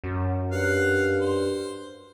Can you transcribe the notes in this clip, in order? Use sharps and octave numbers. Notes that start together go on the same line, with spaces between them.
F#2
G2 F5 F#5
C5